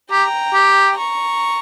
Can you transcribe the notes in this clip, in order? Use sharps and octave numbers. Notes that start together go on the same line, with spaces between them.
G4 G5 A#5
G4
A#5 C#6